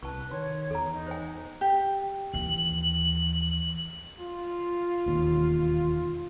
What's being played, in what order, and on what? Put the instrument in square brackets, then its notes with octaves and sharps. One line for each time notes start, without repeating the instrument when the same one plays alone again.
[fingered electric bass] C2 [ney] B4 [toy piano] A5 C#6
[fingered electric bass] D#3 [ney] C#5 [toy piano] C6
[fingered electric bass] E2 [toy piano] A4 A#5
[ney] D#4
[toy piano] C5 G#5
[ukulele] G4
[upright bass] D#2 E3 [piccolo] F#7
[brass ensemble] F4
[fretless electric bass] E1 D#2